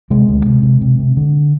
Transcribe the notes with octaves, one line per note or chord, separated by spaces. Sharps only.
C3 G#3
D2
C3
C3
C3
C3
D3